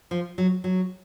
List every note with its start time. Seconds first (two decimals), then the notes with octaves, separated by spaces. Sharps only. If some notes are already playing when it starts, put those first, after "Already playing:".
0.11 F3
0.38 F#3
0.64 F#3